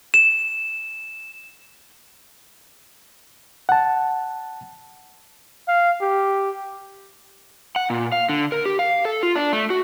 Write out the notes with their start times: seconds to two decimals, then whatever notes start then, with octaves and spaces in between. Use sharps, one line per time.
0.14 E7
3.69 F#5 A5
5.68 F5
6.02 G4
7.76 F#5
7.90 A#2
8.12 F5
8.29 D3
8.52 A#4
8.66 G4
8.79 F5
9.05 A4
9.23 F4
9.36 D4
9.53 A3
9.70 F#4